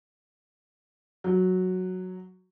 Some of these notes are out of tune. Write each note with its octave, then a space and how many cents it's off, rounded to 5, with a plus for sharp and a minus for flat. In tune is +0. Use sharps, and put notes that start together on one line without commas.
F#3 -5